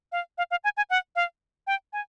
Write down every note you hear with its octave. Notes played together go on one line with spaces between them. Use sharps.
F5
F5
F5
G#5
G#5
F#5
F5
G5
G#5